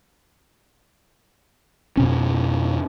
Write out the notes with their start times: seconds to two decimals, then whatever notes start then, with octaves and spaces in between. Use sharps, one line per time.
1.97 F2 B2 C#4